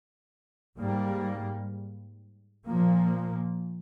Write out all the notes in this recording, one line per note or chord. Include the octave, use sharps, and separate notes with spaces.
G#2 G3 A#3
A#2 F3 A#3